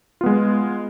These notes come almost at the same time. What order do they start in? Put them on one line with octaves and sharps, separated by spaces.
F4 B3 G#3